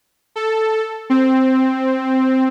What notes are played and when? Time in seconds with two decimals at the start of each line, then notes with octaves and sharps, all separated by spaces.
0.36 A4
1.10 C4